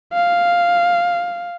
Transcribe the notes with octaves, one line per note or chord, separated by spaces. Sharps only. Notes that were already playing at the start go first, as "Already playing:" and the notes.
F5